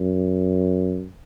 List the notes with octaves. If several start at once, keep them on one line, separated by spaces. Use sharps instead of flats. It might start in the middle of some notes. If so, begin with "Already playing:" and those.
Already playing: F#2